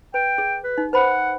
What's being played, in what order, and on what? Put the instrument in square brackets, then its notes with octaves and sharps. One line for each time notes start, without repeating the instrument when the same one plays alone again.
[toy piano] B4 [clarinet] G5
[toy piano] G#4
[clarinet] B4
[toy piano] D#4
[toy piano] B4 C5 B5 [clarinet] F#5